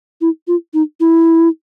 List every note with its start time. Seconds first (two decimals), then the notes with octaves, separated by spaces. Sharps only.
0.21 E4
0.47 F4
0.74 D#4
1.00 E4